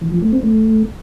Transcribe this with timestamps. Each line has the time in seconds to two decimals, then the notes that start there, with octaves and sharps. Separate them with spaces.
0.01 E3
0.12 F3
0.22 A3
0.33 C4
0.43 A3